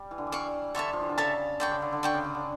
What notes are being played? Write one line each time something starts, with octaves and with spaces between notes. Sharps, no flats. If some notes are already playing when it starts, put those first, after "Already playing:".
Already playing: G3
E3
D3
E3
D5 F5 C#6
D3 A4 C#5 E5 A5
F3
E3
D3
C#3 A4 C#5 E5 A5
D3 D5 G5 C#6
C#3
D3
D3
D3 D5 G5 C#6
C#3
C#3
D3